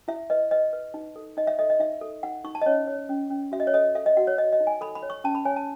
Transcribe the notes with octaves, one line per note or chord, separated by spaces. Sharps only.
E4 E5
B4 D#5
B4 D#5
B4
D#4
A4
D#4 D#5
E5
A4 D#5
D#5
D#4 E5
A4
D#4 F#5
D#4 C#6
A5
D#5
C#4 C#5
C#5
C#4
C#4
F#4 E5
D#5
C#5
A4 D#5
A4 E5
D#5
F#4 F#5
C#5
C#5 D#5
D#5
D#4
G#5
A4 B5
B5
C#5
C#6
C#4 A5
B5
C#5 G#5
A5